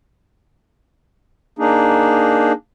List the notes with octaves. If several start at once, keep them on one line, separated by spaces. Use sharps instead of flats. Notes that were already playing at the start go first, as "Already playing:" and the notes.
A#3 D4 D#4 G#4